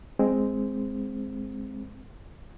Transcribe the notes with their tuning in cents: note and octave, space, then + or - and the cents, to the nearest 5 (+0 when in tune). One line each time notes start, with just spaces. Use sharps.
G#3 +0 C4 +0